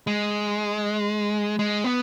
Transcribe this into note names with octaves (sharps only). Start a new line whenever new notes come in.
G#3
G#3
B3